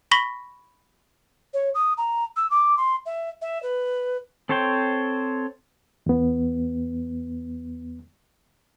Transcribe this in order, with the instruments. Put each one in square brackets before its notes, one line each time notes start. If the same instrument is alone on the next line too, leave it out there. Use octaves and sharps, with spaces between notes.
[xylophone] B5 C#6 A#6 B6 F#7 G7
[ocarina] C#5
D#6
A#5
E6
D6
C6
E5
E5
B4
[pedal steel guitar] C4 A4 C5 C#5 G5
[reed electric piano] E2 B3